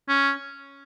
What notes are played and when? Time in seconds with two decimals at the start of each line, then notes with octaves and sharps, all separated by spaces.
0.08 C#4